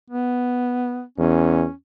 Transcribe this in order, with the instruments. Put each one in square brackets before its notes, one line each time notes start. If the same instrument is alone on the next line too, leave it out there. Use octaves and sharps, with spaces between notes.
[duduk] B3
[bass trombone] E2 [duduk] C#4